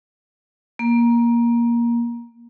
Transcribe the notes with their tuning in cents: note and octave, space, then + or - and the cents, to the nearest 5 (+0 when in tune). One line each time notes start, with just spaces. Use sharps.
A#3 +15